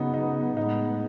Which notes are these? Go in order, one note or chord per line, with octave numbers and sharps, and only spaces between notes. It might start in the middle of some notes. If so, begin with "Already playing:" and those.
Already playing: C#3 F#3 B3 D#4
D#4
A2 G#3 B3 D#4